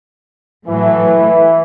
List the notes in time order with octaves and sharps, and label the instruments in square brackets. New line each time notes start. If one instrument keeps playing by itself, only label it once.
[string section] A2 F#3 A3 [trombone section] E3